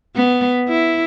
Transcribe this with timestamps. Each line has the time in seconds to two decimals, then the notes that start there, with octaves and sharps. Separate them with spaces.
0.16 B3
0.69 E4